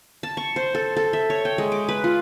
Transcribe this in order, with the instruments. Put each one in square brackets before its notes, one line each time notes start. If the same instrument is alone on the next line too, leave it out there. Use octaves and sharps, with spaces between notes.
[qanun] A5
C#6
C5
A4
A4
E5
C#5
G5
G#3
D6
B4
F4